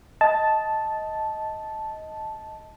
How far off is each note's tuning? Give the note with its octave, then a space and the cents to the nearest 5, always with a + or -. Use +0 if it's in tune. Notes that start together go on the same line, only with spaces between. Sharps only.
D#5 +15 A5 -5